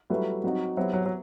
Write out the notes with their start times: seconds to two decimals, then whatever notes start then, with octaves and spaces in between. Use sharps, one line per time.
0.10 F#3 G3 A3 E4 B4
0.44 F#3 C4 D#4 F#4
0.77 F#3 B3 E4 G4 C5 E5
0.93 F#3
1.06 F#3